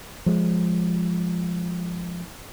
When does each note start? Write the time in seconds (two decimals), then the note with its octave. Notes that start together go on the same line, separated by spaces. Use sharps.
0.26 F3 G#3